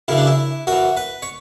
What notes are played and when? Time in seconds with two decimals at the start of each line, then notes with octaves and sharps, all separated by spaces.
0.08 F#2 C#3 E3 E4
0.18 D4
0.27 E4
0.67 F#2 E3 F#4
0.97 B4
1.22 C#5